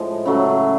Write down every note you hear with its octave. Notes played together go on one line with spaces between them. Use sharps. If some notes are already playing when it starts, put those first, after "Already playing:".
Already playing: A2 F3 G#3
C#3 F#3 A3